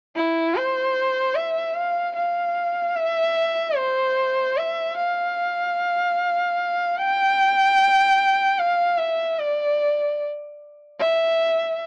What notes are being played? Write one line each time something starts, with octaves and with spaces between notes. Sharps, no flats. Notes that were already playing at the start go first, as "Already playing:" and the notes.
E4
C5
E5
F5
F5
E5
C5
E5
F5
G5
F5
E5
D5
E5